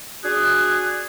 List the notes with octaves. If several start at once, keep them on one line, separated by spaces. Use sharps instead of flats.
D4 F#4 G#4 F#6